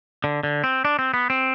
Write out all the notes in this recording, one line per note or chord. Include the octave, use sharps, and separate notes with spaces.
D3
D3
C4
D4
C4
B3
C4